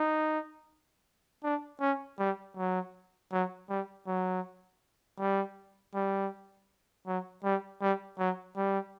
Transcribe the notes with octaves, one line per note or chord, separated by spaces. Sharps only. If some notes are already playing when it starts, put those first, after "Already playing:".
Already playing: D#4
D4
C#4
G3
F#3
F#3
G3
F#3
G3
G3
F#3
G3
G3
F#3
G3